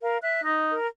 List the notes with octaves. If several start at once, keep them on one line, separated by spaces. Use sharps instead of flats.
A#4 F5
E5 F#6
D#4 D#5
A#4